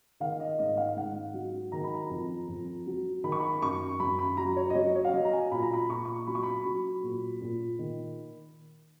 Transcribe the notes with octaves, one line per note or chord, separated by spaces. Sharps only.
D#3 F5
D#5
G#2 D#5
F5
G#2 F#5
F#3
D#3 A#5
B5
A#5
F2
F2
F#3
D#3 B5
C#6
B5
F#2 C#6
F#2 B5
B5
F#3 A#5
C#5
D#5
F#3 C#5
C#5
F5
F#3 D#5
A#5
G#5
A#2 B5
A#5
B5
A#2 C#6
C#6
F#3 B5
C#6
B5
F#3
A#2
A#2
D#3